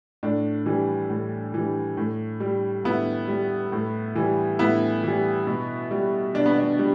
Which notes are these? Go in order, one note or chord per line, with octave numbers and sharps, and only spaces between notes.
A2 D4
E3 G3
A2
E3 G3
A2
G3
A2 B3 E4
G3
A2
E3 G3
A2 B3 E4
E3 G3
B2
G3
B2 D4
B3
D4
G3